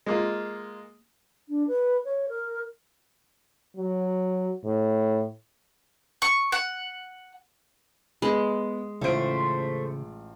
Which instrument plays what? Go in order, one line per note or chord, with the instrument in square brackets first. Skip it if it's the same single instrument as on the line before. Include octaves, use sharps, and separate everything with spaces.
[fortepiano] G#3 A#3 F4
[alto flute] D4
B4
C#5
A#4
[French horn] F#3
A2
[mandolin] C#6
F#5
[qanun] G#3 [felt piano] B3 B5
[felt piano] A1 F4 D7 [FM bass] C#3 [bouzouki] A3 C5